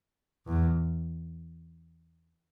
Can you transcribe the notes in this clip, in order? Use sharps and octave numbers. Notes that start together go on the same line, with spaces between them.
E2